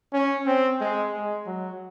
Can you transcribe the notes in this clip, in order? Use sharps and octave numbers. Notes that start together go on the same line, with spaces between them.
C#4
C4
G#3
G#3
F#3